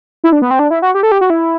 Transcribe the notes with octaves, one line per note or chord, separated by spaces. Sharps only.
E4
D4
B3
C4
D4
E4
F#4
G4
A4
G4
F#4
E4